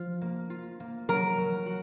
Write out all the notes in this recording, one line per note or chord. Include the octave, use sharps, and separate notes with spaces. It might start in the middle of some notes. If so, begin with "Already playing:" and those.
Already playing: F3 F4
A#3
F4
A#3
F#3 A#4
F#3
F#4